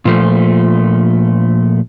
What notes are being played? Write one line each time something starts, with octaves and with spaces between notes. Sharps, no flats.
A#2 F3 A3